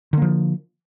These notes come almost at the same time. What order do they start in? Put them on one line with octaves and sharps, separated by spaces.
D3 A#3 F3